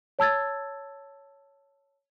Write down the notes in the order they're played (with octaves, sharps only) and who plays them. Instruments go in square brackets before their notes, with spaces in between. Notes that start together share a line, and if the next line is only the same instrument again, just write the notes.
[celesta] C#5 A5 E6 G#6 A6